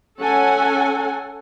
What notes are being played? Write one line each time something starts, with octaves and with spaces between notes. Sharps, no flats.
C#4 A4 F#5 G#5